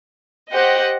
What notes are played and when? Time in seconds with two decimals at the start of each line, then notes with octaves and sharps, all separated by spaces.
0.52 G4 C5 D#5 F#5